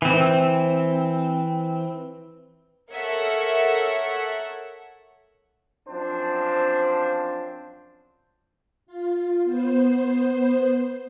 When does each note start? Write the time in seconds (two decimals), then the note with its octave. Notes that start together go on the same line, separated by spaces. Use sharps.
0.02 E3 C4
2.93 A4 A#4 C#5 E5 F#5
5.88 F#2 F3 C4 D4 C5
8.87 F4
9.45 B3 C5